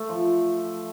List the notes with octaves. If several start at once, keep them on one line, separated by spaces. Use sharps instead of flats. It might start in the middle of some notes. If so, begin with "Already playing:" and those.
Already playing: A3
F3